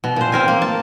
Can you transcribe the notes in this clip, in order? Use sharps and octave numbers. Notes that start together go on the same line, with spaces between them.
B2
A#2 C5
C4 A#4 G#5
A#3
A5